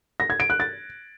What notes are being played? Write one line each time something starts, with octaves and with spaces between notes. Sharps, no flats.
A#6
G#6
D7
F#6
A6